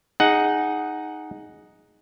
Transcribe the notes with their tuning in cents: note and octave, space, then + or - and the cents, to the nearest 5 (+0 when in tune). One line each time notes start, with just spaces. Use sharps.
D#4 +0 G#4 +0 F#5 +5